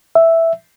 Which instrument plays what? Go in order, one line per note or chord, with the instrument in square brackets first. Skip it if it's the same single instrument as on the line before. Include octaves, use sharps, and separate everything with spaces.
[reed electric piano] E5